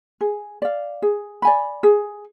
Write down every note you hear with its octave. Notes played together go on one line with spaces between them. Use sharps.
G#4
D5 F5
G#4
D5 G#5 B5
G#4